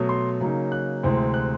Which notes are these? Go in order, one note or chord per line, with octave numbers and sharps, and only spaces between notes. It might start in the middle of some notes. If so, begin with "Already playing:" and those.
Already playing: B2 F#3 A3
C6
C#3 F#3 A#3 D#4
F#6
D2 C3 E3 G#3 C4
F#6